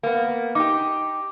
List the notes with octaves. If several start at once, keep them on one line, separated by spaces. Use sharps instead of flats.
A#3 B3
D#4 G4 D6